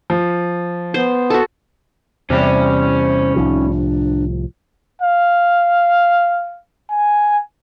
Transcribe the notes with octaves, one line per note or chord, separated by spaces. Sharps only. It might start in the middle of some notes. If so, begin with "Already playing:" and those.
F3
B3 C5
F#4 A4
E2 C3 G3 C#4 C5
C2 A2 F3 D#4
D4
F5
G#5